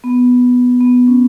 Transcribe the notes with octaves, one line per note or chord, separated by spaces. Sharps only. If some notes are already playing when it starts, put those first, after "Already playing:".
B3
B3
C#4